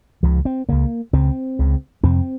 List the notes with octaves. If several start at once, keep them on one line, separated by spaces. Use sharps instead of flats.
C#2 C#3 F3
C4
C#2 C#3 A#3
C#2 C#3 C4
C#2 C#3
F2 C3 C4